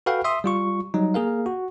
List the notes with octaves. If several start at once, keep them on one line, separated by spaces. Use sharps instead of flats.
F#4 A4 B4 F5 G5
E5 C6 D#6
G3 F4 C#6
F#3 G3 D#4
A#3 G#4 A#4 F5
F#4